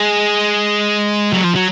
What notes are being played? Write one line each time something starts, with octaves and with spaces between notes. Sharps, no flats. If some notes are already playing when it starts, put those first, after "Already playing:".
Already playing: G#3
F#3
F3
F#3